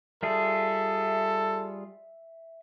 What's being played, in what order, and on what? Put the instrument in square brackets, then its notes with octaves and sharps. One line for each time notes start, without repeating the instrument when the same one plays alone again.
[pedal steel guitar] G3 F4 G#4 [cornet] A4 [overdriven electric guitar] E5